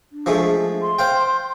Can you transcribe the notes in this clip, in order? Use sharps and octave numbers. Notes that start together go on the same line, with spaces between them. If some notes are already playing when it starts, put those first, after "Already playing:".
D4
F3 G#3 A3
G#4
C6
C5 F5 G5